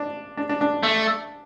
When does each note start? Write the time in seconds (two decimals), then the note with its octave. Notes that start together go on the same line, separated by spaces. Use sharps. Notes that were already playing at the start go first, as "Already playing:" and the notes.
Already playing: D4
0.37 D4
0.49 D4
0.61 D4
0.83 A3